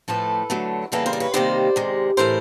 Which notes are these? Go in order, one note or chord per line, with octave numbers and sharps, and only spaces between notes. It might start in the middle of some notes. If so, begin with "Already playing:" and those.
A2 F3 A3 A4 B4
D3 F#3 A3
C#3 E3 G3 A#3 A4 B4
A#4 C5
D5
B4 C#5
C3 D#3 G3 A#3 C5 D5
C3 D#3 G#3
A2 E3 A3 A#4 C5